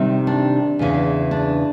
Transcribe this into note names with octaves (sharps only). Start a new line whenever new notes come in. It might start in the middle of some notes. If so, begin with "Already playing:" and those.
Already playing: C3 D#3 G3 C4
D4
E2 C#3 E3
D4